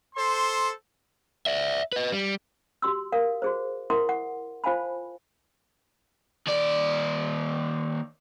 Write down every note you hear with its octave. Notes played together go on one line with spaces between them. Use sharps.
A4 C5 C6
D5 E5
B4 D#5
G3
F#4 G4 C6 E6
A#4 F5
F#4 G#4 C5
E4 A#4 E5 F#5 C6 D6
F#5
F4 C5 F5 G#5 A5 B5
D#2 D5